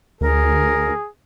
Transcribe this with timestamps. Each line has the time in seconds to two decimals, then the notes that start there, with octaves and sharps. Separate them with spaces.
0.21 D2 G#4 A#4